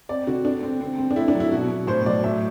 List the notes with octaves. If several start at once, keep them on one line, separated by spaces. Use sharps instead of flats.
C4 D5
D3 F#4
D3 D4
C4
C4
C4
D4
A3 E4
D4
F#3
E4
B2 F#4
B2
A2 C5
F#3 D5
A2 E5